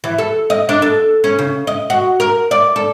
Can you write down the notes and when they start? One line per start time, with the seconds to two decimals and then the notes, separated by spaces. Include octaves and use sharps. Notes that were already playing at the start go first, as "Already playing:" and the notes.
0.04 E3
0.19 A4
0.50 D#5
0.69 D4
0.82 A4
1.24 C#4
1.39 C#3
1.67 D#5
1.90 F#4
2.20 A#4
2.51 D5
2.76 A4